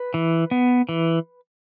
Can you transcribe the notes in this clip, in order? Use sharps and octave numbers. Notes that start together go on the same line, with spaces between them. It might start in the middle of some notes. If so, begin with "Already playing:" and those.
Already playing: B4
E3
B3
E3